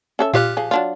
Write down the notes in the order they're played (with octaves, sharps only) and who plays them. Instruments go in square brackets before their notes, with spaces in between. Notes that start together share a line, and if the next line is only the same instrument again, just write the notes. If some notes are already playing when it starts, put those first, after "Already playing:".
[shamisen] C#4 A4 E5
[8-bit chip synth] A#2 G4 F#6 [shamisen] F4 C#5 F5
[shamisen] F3 G#4
F#3 D4 F4